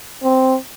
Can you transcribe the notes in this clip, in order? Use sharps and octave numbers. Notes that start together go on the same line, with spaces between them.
C4